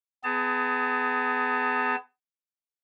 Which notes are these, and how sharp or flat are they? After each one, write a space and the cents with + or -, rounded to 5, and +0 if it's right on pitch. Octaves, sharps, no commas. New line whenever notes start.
B3 +35 G#4 +5 A5 +30